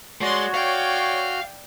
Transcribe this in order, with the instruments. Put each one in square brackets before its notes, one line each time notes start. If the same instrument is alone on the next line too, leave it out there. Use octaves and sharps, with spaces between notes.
[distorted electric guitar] G#3 [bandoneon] F#4 [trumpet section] C#5 [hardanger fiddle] D5 C6
[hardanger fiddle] D5 G5 [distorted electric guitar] F5